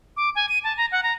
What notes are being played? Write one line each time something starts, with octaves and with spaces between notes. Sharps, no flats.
D6
G#5
D#7
A5
A#5
F#5
A#5